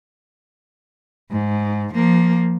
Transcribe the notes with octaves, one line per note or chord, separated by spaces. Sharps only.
G#2
F3 A#3